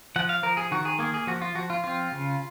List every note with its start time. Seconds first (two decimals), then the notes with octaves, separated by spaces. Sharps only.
0.16 F3 F#5
0.29 F5
0.43 F3 A#4
0.57 G#4
0.71 D#3 F#4
0.85 G#4
0.99 A#3 G#4
1.14 G#4
1.27 F3 F#4
1.42 F4
1.55 F3 F#4
1.70 F4
1.84 C4 F4
2.12 C#3